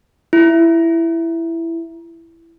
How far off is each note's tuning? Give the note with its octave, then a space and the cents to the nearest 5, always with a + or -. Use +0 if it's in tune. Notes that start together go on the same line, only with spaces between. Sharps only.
E4 +10